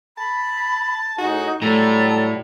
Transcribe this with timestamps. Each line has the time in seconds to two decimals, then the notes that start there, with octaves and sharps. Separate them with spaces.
0.18 A5 B5
1.18 A2 D#4 F#4 G#4
1.62 A2 F#3 G3 A4 A#5